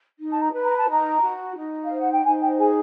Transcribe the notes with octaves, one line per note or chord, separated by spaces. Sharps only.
D#4
A5
A#5
B4
A#5
A5
D#4 A#5
F#4
D#4
F5
C5
F#5
G5
D#4 G#5
G5
G#4 G#5